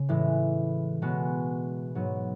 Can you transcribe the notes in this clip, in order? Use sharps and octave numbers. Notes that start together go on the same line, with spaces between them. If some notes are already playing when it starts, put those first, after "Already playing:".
Already playing: C#3
A2 E3 G#3
B2 G#3 B3 F#4
G#2 F#3 B3